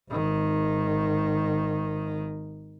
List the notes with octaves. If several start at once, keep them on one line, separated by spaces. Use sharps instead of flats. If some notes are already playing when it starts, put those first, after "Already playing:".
G#1 D#3